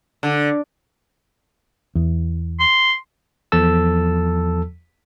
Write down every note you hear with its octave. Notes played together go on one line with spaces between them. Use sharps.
D3
E2
C6
E2 F3 A4 A5 E6